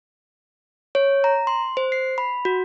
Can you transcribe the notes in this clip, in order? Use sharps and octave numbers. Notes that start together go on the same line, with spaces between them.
C#5
A#5
C6
C5
C7
B5
F#4